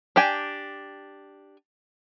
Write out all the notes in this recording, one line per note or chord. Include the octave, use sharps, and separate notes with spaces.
D4 G4 G5 G#5